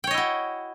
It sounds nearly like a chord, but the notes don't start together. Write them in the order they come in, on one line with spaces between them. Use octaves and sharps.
G5 C#5 D#5 E4 F#4